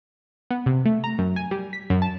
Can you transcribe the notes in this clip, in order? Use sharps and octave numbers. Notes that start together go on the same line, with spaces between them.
B3
C3
A3
A#5
F#2
G#5
G3
B6
F#2
A5